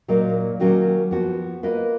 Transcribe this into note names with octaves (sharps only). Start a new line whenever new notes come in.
A#2 F#3 A#3 D#4
D#3 F#3 A#3 C#4 F#4
F3 B3 F#4
A#3 F4 B4 D#5